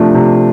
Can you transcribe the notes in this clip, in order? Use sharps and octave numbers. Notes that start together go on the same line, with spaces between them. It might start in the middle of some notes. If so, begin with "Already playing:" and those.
Already playing: C3 F3 A3 D4
C3